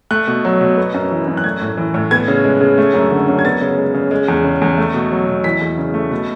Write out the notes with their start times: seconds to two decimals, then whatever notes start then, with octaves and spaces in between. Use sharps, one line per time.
0.11 A3 F#6
0.27 B2
0.45 F#3
0.61 B2
0.78 B3
0.94 F#2
1.11 E3
1.28 F#2
1.37 F#6
1.44 A3 G#6
1.61 A2
1.77 E3
1.94 A2
2.11 B3 G#6
2.28 C#3
2.44 G#3
2.61 C#3
2.78 A3
2.94 F#2
3.11 D3
3.28 F#2
3.39 G#6
3.45 B3 A6
3.62 C#3
3.78 G#3
3.94 C#3
4.11 G#3
4.28 E2
4.44 C#3
4.62 E2
4.78 A3
4.94 B2
5.11 F#3
5.28 B2
5.44 E3 B6
5.61 E2
5.78 C#3
5.94 A3
6.11 B2